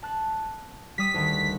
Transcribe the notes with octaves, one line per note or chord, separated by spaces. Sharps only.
A5 F#6
G3 D#6 B6
D2 D3 D#3